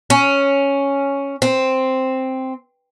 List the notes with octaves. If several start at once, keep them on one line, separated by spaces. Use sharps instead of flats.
C#4
C4